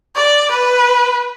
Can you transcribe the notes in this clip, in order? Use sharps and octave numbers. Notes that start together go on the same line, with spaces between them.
D5
B4